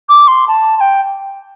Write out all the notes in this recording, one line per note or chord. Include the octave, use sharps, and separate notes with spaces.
D6
C6
A5
A5
G5